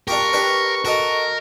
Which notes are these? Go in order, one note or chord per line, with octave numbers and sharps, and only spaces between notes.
D4 F4 G4 A#4 C#6
D4 G4 B4
F#4 A4 A#4 D#5